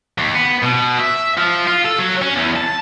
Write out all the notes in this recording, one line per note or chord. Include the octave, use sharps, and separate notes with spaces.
D#2
B3
B2
E5
F3
F4
A4
F#3
C#4
E2
A5